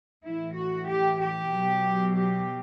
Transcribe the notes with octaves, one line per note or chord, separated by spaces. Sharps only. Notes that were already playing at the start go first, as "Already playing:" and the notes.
A2 E3 E4
F#4
G4
G4
B2 F#3
G4